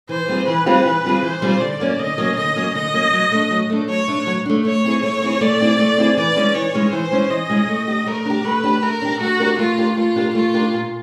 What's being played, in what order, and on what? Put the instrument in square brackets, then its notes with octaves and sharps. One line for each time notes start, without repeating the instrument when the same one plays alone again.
[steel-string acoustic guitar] E3 [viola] C5
[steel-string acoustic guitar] G3 C4 F4 G#4
[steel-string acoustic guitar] E3 [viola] B4
[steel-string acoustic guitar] G3 C4 F4 G#4
E3
G3 C4 F4 G#4
[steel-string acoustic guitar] E3 [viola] C5
[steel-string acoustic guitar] G3 C4 F4 G#4
[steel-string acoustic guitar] D3 [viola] D5
[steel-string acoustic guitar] F#3 A#3 C#4
[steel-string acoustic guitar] D3 [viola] D#5
[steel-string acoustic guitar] F#3 A#3 C#4
[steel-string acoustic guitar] D3 [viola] D#5
[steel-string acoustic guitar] F#3 A#3 C#4
[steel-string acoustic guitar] D3 [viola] D#5
[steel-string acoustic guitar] F#3 A#3 C#4
F#3
A3 D4
F#3
A3 D4
[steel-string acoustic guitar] F#3 [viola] C#5
[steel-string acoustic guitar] A3 D4
F#3
A3 D4
[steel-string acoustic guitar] A3 [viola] C#5
[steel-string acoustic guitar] C4 E4 G#4
[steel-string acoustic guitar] A3 [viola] C#5
[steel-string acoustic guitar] C4 E4 G#4
[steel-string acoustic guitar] A3 [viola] D5
[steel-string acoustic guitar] C4 E4 G#4
A3
C4 E4 G#4
[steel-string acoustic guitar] E3 [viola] D5
[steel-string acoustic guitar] G#3 C#4 E4 G#4
[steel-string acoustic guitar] E3 [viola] C#5
[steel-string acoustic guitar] G#3 C#4 E4 G#4
[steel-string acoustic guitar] E3 [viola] C5
[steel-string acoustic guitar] G#3 C#4 E4 G#4
[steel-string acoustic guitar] E3 [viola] D#5
[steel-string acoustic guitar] G#3 C#4 E4 G#4
A3
D4 G4
[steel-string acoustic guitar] A3 [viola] A#4
[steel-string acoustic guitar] D4 G4
[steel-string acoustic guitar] A3 [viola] B4
[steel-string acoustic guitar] D4 G4
[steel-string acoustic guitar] A3 [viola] A#4
[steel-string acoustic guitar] D4 G4
[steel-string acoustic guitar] A3 [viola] F#4
[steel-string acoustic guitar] D4 G4 A#4
[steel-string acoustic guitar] A3 [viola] F4
[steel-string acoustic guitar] D4 G4 A#4
[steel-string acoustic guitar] A3 [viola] F4
[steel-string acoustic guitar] D4 G4 A#4
[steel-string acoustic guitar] A3 [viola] F4
[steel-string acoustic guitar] D4 G4 A#4
A#2